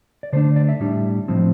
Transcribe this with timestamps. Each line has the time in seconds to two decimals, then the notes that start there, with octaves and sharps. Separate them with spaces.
0.23 D5
0.33 D3 A3 D4 C5
0.56 D5
0.69 E5
0.80 A2 G3 D4
1.28 A2 F3 C4